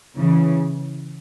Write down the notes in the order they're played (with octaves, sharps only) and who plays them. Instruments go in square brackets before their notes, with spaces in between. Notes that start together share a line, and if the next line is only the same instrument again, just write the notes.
[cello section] C#3 E3